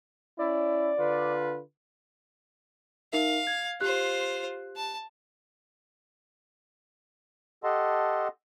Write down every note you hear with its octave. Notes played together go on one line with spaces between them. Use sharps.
C#4 E4 D5
D3 F4 B4
D#4 A#4 E5 F5
G#6
F4 G4 C5 F#6
A5
G4 A4 D#5 F#5 A5 C6